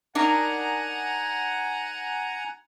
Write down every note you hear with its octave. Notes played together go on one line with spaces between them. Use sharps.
D4 D#4 A#4 F#5 G#5 A#5